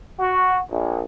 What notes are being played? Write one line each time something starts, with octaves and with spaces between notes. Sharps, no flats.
F#4
A#1